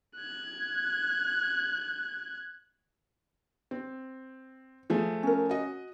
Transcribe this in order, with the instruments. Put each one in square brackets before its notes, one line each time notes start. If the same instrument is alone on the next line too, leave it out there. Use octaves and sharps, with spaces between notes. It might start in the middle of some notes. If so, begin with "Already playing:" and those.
[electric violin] F#6 G#6
[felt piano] C4
F3 A3 G#4
[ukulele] C#4 A#4
[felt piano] F#4 D#5